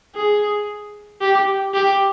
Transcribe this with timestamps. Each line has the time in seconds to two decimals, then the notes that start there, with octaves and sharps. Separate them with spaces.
0.15 G#4
1.21 G4
1.74 G4